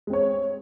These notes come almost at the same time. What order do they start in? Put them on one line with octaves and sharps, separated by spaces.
G#3 C4 C#5